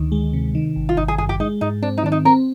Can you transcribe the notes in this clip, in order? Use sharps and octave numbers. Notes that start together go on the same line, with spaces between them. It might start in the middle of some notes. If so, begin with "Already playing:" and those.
Already playing: D2 D#3
G#3
C3
D#3
G#1
F4
G#1 D#4
G#4
G2 G#4
G4
G#3 D#4
G#2 D#4
C4 D4
D#4
D#3 D4
D#4
C4 A#4